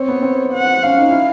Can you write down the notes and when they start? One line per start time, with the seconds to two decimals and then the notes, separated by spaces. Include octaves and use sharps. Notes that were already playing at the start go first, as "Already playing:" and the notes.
Already playing: C4 C#5
0.08 B3
0.22 C4
0.54 F#5
0.83 C#4 F5
0.99 D#4
1.10 E4